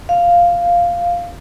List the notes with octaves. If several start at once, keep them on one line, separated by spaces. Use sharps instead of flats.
F5